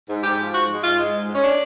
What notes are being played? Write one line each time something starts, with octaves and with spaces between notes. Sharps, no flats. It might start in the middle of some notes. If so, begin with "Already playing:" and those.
G#2
G#2 G4
F3
G#2 F#4
G#3
G#2 F4
G#3
G#2
G#2
C#4
D4